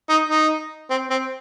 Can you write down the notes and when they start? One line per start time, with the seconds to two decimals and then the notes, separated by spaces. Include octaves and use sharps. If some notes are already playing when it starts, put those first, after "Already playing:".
0.09 D#4
0.29 D#4
0.90 C4
1.10 C4